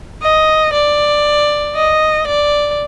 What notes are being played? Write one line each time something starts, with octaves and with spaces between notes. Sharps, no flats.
D#5
D5
D#5
D5